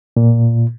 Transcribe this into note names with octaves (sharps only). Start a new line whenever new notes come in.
A#2